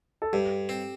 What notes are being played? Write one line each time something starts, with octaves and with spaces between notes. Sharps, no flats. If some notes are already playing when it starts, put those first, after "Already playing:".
A4
G2 G4
C4